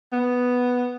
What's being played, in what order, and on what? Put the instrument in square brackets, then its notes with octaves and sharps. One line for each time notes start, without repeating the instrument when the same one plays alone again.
[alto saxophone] B3